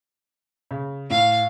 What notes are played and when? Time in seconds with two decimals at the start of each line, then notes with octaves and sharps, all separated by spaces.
0.71 C#3
1.10 A2 F5